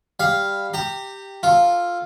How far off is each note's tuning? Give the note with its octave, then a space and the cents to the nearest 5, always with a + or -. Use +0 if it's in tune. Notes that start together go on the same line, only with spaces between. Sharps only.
G3 +10 F5 +0
G4 +0 A#5 -30
F4 +0 A4 +0